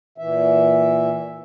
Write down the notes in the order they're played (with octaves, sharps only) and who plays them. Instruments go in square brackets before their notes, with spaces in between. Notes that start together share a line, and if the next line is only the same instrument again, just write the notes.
[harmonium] A#2 E3 E5